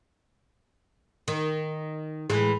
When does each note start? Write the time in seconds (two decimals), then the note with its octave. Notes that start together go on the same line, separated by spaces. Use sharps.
1.28 D#3
2.30 A2 E3 G#3